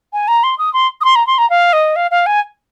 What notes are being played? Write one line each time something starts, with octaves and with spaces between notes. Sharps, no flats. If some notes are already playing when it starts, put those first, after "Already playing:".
G#5
A#5
C6
D#6
C6
D#6
C6
A#5
C6
A#5
F5
D#5
F5
F5
G#5